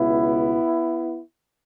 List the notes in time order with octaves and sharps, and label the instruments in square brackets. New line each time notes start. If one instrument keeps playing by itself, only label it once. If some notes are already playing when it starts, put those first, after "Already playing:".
Already playing: [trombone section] C#2 B2 B3 E4